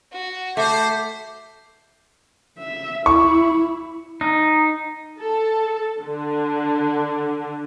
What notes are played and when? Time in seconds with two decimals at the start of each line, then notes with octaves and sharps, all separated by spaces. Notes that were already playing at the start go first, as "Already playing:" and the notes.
0.12 F#4
0.57 A3 C5 D6
2.58 E5
3.06 E4 C#6
4.21 D#4
5.19 A4
6.01 D3